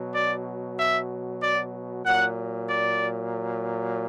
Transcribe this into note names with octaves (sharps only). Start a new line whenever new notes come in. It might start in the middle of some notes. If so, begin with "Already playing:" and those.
Already playing: B2 F#3
D5
E5
D5
A#2 F#3 F#5
D5